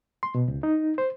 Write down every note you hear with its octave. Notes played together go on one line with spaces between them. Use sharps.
C6
B2
C#2
D#4
C5